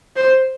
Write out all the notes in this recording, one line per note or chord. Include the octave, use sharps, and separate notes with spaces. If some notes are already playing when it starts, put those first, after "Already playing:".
C5